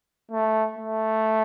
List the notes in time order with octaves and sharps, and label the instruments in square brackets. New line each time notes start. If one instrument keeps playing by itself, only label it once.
[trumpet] A3
A3